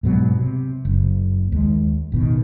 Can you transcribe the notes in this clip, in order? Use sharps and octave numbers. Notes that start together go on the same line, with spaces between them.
G#2 B2 F#3
C3
F#1
D#2 G#3
A1 B2 D#3